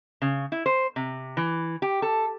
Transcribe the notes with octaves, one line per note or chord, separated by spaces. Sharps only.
C#3
E4
C5
C3
E3
G4
A4